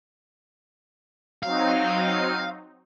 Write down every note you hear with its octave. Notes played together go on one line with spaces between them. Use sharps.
F#3 C4 D#4 F5